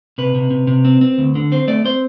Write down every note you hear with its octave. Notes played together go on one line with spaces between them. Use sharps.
C3 B4
C3
C3
C3
C4
C4
D2
D3
C4 C5
A3 D5
C4 C5